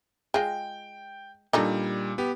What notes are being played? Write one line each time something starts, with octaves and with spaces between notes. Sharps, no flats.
G#3 F4 G5
A#2 G3 D4 D#4 A4
B3 G4